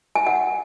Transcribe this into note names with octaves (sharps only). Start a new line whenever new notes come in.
G#5
F#5